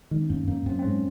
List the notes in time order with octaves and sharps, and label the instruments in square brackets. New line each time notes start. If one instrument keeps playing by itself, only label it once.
[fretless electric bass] D#3 [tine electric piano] G#3
[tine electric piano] C4
[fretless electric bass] F#2 [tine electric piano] A#3
[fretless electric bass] F#2 [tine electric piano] A#3
[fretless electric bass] F#2 [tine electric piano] C4
[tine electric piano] C4
[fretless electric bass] G#2 [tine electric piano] C#4